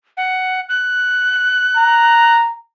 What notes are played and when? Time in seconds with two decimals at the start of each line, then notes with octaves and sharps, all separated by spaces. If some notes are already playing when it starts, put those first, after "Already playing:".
0.17 F#5
0.69 F#6
1.77 A#5